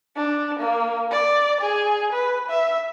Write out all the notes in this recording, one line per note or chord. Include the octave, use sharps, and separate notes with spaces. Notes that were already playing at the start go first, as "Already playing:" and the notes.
D4
A#3
D5
G#4
B4
E5